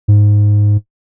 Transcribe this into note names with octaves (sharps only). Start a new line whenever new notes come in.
G#2